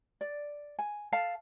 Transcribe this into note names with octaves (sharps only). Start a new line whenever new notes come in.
D5
G#5
A4 F5 A5